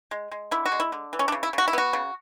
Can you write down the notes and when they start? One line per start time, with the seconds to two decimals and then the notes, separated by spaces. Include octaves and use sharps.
0.11 G#3
0.32 G#3
0.51 D3 E4
0.66 F#4
0.72 G#3
0.80 E4
0.92 D3
1.13 E3
1.19 C#4
1.28 D4
1.32 C#3
1.43 E4
1.53 C#3 F#4
1.68 E4
1.73 B3 F#4
1.93 C#3